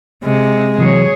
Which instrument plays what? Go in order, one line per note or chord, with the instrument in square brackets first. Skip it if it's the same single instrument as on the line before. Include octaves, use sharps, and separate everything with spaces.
[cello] C3 [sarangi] G#3
[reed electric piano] C3 E3 F#3 [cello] G#4 C#5